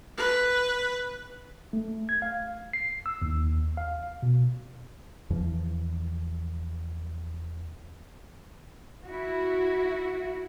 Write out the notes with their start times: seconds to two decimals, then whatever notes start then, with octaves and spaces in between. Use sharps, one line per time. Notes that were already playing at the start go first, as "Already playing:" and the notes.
0.17 B4
1.73 A3
2.09 G#6
2.22 F5
2.73 C7
3.06 E6
3.22 D#2
3.77 F5
4.23 B2
5.30 E2 E3 F3
9.05 E4 F#4